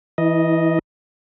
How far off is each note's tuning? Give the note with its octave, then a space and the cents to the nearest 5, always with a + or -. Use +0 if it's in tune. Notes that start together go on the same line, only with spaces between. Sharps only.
E3 +0 E4 -40 D#5 +0